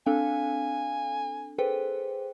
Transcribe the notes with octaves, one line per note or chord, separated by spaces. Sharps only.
C4 D4 A4 F5 G#5
G#4 A4 B4 C5 G5